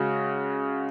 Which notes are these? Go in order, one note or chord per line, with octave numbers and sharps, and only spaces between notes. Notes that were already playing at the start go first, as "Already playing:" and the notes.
Already playing: C#3 G#3 F#4